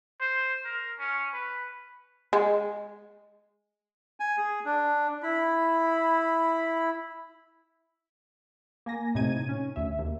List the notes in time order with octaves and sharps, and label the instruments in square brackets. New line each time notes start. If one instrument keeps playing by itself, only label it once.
[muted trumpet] C5
A#4
C#4
B4
[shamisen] G#3
[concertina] G#5
G#4
D4
[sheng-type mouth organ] E4 B5
[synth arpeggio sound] A#3 G#5 A#6
A2 C3 D#4 G#6 D#7
C#4
D2 E5
D#2